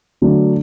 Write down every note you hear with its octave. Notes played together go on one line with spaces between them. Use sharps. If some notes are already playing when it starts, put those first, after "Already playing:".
D3 F#3 A3 D4